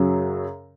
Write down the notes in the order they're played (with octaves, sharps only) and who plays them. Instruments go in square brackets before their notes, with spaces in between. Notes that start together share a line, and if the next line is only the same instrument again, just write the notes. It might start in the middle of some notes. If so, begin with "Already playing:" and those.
Already playing: [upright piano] F#2 C#3 F#3